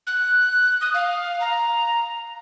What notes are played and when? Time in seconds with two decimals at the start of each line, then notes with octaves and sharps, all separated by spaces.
0.07 F#6
0.81 D#6
0.94 F5
1.41 A#5